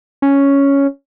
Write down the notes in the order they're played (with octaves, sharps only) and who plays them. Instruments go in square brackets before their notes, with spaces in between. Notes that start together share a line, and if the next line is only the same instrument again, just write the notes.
[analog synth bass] C#4